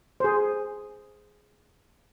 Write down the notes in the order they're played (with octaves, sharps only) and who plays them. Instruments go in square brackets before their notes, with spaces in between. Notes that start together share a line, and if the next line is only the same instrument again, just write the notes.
[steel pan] G#4 C5